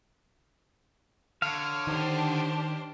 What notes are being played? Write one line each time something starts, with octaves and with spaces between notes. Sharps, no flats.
D3 C#5 F5
D#3 D4 G4 C5